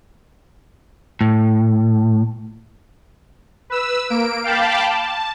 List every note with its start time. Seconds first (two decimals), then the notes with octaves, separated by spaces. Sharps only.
1.21 A2
3.70 B4 E6
4.10 A#3 D7
4.44 F5 G5 A5 B5 D6
4.90 A5